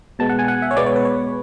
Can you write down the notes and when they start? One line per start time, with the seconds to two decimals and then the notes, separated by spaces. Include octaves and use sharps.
0.19 B2 G#3 B3 A5
0.29 F#5
0.39 G#5
0.48 F#5
0.62 E5
0.71 C#5
0.76 B2 G#3 B3 D5
0.86 C#5
0.96 B4
1.05 C#5